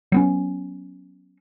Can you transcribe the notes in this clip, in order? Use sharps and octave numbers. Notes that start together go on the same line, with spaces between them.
F#3 B3 C#4